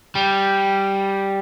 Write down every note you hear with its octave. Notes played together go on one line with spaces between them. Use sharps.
G3